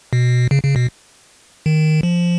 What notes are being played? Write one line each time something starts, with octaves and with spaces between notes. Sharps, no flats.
B2
C#3
C#3
B2
D#3
F3